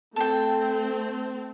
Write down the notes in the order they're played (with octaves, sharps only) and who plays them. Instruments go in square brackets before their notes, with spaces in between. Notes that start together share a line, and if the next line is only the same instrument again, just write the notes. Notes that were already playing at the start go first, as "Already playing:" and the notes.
[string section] A3 C4 [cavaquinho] A4 G5